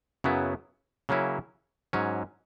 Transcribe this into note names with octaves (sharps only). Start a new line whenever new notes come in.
F#2 C#3 F#3 B3 E4
C#3 F#3 A#3 C#4 E4
G#2 F#3 C#4